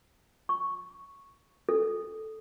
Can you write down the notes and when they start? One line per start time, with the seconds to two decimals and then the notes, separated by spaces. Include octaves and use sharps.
0.49 C#6
1.69 A4